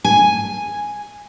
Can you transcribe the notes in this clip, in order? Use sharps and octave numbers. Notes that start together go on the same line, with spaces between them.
G#5